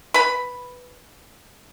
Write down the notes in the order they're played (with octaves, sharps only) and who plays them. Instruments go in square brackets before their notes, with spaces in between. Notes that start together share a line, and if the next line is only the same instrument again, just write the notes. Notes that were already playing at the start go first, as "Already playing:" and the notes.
[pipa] B4 B5